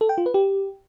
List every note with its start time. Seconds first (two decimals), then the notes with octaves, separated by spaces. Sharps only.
0.01 A4
0.09 G5
0.18 F4
0.26 B4
0.34 G4